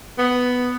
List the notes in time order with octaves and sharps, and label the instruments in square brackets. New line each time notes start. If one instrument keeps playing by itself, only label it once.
[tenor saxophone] B3